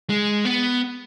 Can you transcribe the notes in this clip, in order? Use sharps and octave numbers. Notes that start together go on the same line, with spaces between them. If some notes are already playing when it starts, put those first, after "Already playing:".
G#3
B3